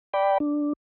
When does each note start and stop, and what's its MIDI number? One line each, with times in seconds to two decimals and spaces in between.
0.14 0.38 74
0.14 0.38 79
0.14 0.38 83
0.40 0.73 62